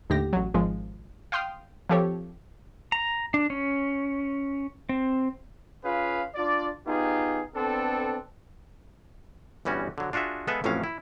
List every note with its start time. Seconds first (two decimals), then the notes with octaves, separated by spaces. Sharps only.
0.10 D#2 A2 D3 G4 A#6
0.33 A1 F#3
0.54 G#1 F3 G#3
1.32 F5 G5 C6 D#6 F6
1.89 F3 C4 G4 A4 C#5
2.92 A#5
3.34 D4
3.50 C#4
4.89 C4
5.85 C#4 F4 G#4 B4 F5
6.35 D4 F4 D5
6.87 B3 D#4 F4 G4 G#4
7.56 B3 C4 D4 A4
9.65 G1 E3 G3 C#4 F#4
9.98 D3 F#3
10.13 D4 F4 F#4 G#4 E5
10.47 G#3 B3 A4 B4 E5 F5
10.64 A1 F2 A2 F#3 C#4 F5
10.84 E4